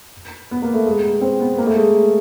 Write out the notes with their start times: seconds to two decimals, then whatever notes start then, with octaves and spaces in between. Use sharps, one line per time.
0.51 B3
0.62 A#3
0.74 A3
0.86 G#3
1.04 B3
1.21 C4
1.40 B3
1.58 A#3
1.67 A3
1.76 G#3